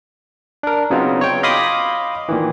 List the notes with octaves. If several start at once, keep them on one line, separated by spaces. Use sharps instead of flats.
D4 A#4
C#3 F#3 B3 C4 D#4 F4
C#5 G5
D#5 F5 B5 C6 D6 D#6
A#2 D#3 E3